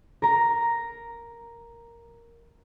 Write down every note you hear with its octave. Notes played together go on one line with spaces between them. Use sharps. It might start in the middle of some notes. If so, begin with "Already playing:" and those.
A#4 A#5